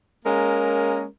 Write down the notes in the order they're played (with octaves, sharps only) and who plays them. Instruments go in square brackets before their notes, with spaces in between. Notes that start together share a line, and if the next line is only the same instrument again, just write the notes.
[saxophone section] G#3 A#3 C#4 A#4